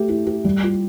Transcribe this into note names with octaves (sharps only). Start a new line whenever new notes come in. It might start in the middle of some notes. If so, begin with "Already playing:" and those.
Already playing: A3 G4
E4
G4
G3
F4